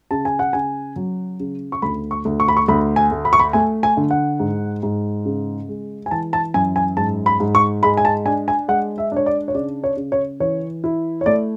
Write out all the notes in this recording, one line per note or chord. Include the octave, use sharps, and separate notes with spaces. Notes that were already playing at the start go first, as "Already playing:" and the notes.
C#3 A5
G#5
F#5
C#3 G#5
F#3
C#3
C#6
D2 B5
C#6
D2
C#6
B5
C#6
D2 B5
G#5
A3
B5
C#6
B5
A3 G#5
G#5
D3
F#5
G#2
G#2
C#3
G#3
G#5
E3 A5
A5
F#2 G#5
G#5
G#2 A5
B5
G#2
C#6
G#3 B5
G#5
A5
D4 G#5
G#5
G#3 F#5
E5
D4 C#5
D5
C#5
C#3 D5
C#5
C#3
C#5
E3 C#5
E4
C#5
A3 D5